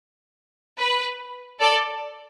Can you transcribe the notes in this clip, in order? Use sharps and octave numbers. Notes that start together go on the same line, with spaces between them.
B4
A4 D5